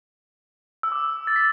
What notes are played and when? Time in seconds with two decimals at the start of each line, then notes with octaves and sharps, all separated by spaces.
0.83 E6
0.92 D6
1.27 A6
1.36 B6